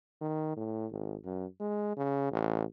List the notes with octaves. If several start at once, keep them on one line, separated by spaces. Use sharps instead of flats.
D#3
A2
G#1
F#2
G#3
C#3
A1